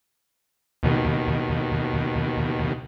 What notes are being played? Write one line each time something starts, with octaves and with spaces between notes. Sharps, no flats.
D#2 B2 D#3